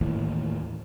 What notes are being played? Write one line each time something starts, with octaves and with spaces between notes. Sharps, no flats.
D#2 A2 E3